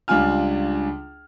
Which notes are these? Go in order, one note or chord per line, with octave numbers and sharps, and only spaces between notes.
C#2 G3 D4 F4 G#5 F6